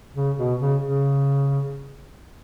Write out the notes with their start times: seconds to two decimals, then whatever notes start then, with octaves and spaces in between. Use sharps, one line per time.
0.15 C#3
0.38 B2
0.60 C#3
0.82 C#3